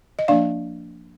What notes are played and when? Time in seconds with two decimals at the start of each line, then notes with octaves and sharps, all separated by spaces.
0.19 D#5
0.28 F3 A#3 D4 D5 F5